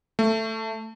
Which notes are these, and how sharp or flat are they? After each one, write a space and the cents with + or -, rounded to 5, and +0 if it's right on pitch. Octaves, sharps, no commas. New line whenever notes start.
A3 +10